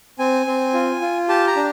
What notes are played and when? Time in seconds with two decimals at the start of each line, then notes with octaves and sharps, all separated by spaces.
0.19 C4 G#5
0.46 C4
0.74 F4
1.01 F4
1.29 G4 A5
1.47 A#5
1.56 D4